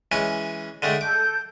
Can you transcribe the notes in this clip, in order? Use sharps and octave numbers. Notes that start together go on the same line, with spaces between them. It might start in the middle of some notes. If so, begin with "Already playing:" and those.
E3 G#3 C#4
D3 G#3 A3 G5
A4 D6 G6